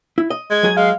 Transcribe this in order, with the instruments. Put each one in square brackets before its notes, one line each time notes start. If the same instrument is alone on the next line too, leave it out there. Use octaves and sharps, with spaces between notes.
[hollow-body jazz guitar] E4
D#5
[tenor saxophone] G#3 [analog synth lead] G#6
[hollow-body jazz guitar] F#3 G#4
[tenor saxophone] G#3 [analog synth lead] F5